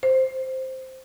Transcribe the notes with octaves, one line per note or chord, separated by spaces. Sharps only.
C5